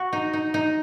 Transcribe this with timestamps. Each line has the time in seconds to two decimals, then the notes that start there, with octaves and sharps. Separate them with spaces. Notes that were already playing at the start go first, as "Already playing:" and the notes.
Already playing: F#4
0.13 D#4
0.33 D#4
0.54 D#4